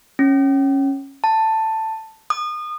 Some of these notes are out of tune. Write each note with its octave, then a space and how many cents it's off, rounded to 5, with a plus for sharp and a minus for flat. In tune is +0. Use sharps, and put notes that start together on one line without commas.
C#4 -15
A5 +10
D#6 -30